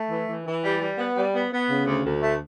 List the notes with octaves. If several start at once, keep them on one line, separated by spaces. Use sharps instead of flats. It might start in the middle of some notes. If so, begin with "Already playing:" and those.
Already playing: A3
E3
E3
E3
G3
G3
B3
G3
B3
B3
C#3
D2
D2
A3